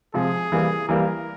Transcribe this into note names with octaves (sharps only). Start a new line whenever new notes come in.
C3 F3 G#3 G#4
E3 G3 A#3
E3 G3 A#3 A#4